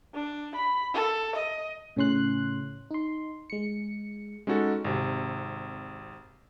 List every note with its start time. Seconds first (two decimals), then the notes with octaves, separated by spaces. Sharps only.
0.15 D4
0.55 B5
0.94 A4
1.36 D#5
1.96 A2 C#3 C#4 C6 F#6
2.91 D#4 C6
3.50 G#3 C#7
4.47 G#3 C#4 D#4 F#4 A4
4.85 G#1 C3